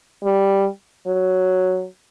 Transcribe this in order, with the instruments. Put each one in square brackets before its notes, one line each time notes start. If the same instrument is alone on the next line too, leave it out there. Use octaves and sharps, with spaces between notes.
[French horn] G3
F#3